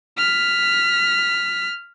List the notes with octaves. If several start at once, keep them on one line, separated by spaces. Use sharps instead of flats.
F6 B6